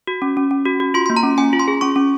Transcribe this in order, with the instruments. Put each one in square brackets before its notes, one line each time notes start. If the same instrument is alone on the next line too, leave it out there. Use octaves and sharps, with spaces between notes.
[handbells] F#4
C#4
C#4
C#4
F#4
F#4
F4 C6
C6
A#3
A#5
C#4
C#4 G#5
F4
C6
G#4
C#4 C#6
C#4